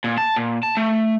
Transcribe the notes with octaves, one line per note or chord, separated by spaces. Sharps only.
A#2
A5
A#2
A5
A3